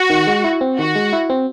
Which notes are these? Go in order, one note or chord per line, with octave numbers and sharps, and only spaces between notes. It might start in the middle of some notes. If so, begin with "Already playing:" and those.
Already playing: F#4
D#3
G#3
E4
C4
D#3 F#4
G#3
E4
C4